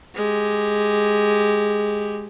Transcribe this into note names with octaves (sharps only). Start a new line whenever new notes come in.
G#3 G4